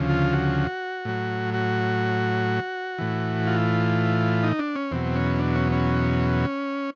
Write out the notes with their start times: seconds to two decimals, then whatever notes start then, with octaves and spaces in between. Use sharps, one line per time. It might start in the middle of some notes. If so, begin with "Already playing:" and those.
Already playing: D2 C#3 F3
0.09 F4
0.33 F#4
1.05 A2 F#3
1.54 F#4
2.98 A2 E3
3.47 F4
4.43 D#4
4.59 D4
4.76 C#4
4.91 E2 B2 F#3 C4
5.16 C#4
5.39 D4
5.56 C#4
5.72 C#4